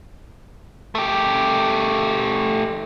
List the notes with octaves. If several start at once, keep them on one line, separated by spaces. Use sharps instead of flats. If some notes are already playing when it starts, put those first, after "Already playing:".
A3 G4